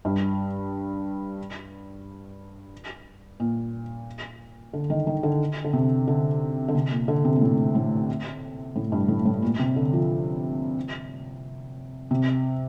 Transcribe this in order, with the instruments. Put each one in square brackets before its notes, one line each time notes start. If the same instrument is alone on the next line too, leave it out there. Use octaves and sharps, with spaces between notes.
[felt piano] G2
A#2
D3
D#3
D#3
D3
D3
C3
D3
D3
C3
A#2
D3
C3
A#2
A2
A2
A2
G2
A2
A2
A#2
C3
D3
F3
C3